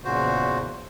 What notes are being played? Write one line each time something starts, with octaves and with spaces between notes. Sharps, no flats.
E2 A#2 C#3 F#4 C5